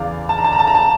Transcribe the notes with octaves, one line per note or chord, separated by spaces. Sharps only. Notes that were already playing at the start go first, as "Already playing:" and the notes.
Already playing: E2 C#3 E3 D5 F5
A5
A#5
A5
A#5
A5
A#5
A5